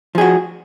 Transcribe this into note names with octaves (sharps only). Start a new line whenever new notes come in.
F3 F#4 G#4